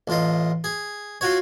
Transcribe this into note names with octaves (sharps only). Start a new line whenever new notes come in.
A1 F4 D#5
G#4
F4 F#4 C#5